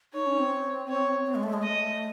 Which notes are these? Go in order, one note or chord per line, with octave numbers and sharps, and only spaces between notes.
D#4 C#5
C#4
C4
C#5
C4
G#3
A3
G#3
A3 D#5